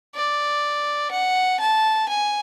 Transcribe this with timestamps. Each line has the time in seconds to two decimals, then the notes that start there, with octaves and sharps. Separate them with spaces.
0.15 D5
1.11 F#5
1.60 A5
2.08 G#5